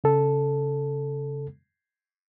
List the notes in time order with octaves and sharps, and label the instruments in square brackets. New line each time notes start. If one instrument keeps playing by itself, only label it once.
[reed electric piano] C#3 A4